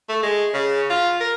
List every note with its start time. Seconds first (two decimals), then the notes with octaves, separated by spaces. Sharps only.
0.09 A3
0.23 G#3
0.54 C#3
0.90 F4
1.21 A#4